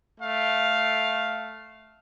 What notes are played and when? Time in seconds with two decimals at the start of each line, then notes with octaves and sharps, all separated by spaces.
0.19 A3 F5